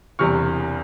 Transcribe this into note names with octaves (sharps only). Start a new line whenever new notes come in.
E1 E2 C3 G3 C#6 F6